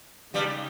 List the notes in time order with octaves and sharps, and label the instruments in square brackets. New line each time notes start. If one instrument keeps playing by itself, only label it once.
[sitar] G2 G3 [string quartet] C#3 G#3 D#4 G4